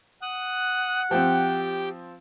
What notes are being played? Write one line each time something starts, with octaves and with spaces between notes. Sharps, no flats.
F#5 D#6 F#6
F3 C4 G4 G5